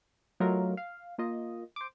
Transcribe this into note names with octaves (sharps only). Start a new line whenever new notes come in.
F#3 A3 D#4 F4 A#4
F5
A#3 F4 D#5
C5 D6